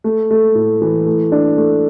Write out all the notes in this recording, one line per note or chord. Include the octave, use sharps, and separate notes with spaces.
A3
A3
A2
E3
A3
D4
A3